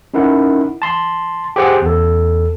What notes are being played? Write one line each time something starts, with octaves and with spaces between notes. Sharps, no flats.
C#4 D#4 E4 A#4 F#5
A5 C6
G4 G#4 C5 F#5
E2 A4